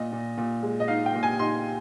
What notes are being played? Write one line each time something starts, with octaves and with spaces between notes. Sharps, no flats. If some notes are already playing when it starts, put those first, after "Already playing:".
Already playing: A#2 D#5
A#2
A#2
G#3
D#5
D#4 F5
G5
A#2
G#5
D#4 C6